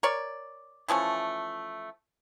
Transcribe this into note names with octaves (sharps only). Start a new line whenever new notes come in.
A#4 C#5 D5
E3 F3 A3 C#4